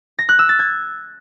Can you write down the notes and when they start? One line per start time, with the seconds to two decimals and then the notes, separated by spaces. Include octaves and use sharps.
0.19 A#6
0.29 F#6
0.39 E6
0.49 A6
0.59 G#6